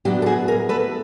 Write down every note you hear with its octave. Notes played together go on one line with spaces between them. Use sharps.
A2 F#3 B3 D4 F4 G4
A4
F#4 G#4
G#4 A#4
A4 B4